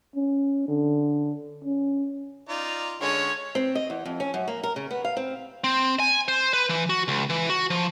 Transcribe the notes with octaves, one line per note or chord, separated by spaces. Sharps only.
C#4
D3
C#4
D#4 F4 D5
D3 G#3 C#4 C#5
C4
D#5
E2
F2
C#4
F#2
A#3
A#4
C#3
B3
F5
C4
C4
G#5
C5
B4
E3
F#4
C#2
E3
F#4
F3